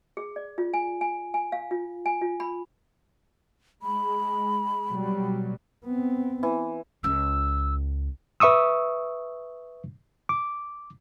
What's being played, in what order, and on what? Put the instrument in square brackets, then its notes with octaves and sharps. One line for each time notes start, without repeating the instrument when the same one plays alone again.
[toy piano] G#4
D5
F4
G#5
G#5
G#5
F5
F4
G#5
F4
B5
[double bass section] G#3 [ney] B5
[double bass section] B2 F#3 G3
[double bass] B3 C4
[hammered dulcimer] E3
[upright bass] C#2 F4 [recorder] E6
[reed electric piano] B4 E5 C#6 D#6 E6
D6